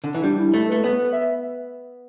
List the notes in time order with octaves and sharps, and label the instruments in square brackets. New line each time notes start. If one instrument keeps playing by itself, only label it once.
[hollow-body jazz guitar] D3
E3
[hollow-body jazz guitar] G3 [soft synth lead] D4
[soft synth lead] E4
[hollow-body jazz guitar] A3 [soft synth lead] A4
[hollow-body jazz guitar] A3 [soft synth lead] B4
[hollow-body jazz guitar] B3 [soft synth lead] B4
[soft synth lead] B4
E5